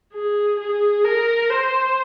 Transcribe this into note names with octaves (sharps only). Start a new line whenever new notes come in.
G#4
G#4
A#4
C5